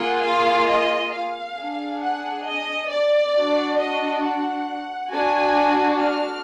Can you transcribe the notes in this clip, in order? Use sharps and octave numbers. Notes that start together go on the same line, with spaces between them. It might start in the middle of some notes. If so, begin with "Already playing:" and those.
Already playing: A#3 F4 G#4 F#5
F5
D#5
F5
D4 G#4
F#5
D#5
D5
D4 F#4
D#5
F#5
D4 F#4 G#5
F6